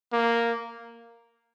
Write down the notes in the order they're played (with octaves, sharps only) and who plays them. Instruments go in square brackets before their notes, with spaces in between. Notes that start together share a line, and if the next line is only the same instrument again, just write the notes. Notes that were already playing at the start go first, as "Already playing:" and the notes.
[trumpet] A#3